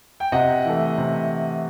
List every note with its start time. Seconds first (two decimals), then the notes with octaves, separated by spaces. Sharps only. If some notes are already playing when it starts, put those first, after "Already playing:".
0.20 G5
0.32 C3 D#5 F#5
0.65 E3 A3
0.98 C3